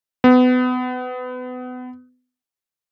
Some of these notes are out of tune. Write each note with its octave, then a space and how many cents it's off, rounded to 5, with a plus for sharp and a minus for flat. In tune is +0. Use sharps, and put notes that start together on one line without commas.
B3 +30